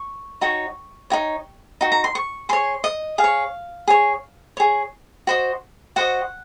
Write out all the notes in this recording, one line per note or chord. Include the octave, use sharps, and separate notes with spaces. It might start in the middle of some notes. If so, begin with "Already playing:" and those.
Already playing: C#6
D#4 F#4 C#5
D#4 F#4 C#5
D#4 F#4
A#5
C6
C#6
G#4 C#5 C6
D#5
G#4 F5
C#5
G#4 C#5
G#4 C#5
F#4 C5 D#5
F#4 C5 D#5 F#5